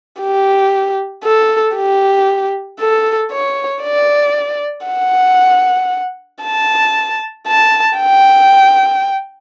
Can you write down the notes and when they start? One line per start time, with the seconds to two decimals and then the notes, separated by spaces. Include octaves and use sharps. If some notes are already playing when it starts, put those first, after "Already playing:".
0.21 G4
1.24 A4
1.76 G4
2.80 A4
3.32 C#5
3.83 D5
4.87 F#5
6.43 A5
7.47 A5
7.98 G5